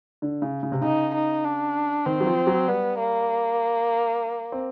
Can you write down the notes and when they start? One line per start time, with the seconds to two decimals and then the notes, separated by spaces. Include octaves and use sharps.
0.22 D3
0.42 C#3
0.63 C#3
0.72 C3
0.81 C#3 D#4
1.14 D#4
1.44 D4
2.06 D#3 C4
2.20 F#3
2.27 F3
2.47 F#3
2.68 G3 B3
2.99 A#3
4.52 C4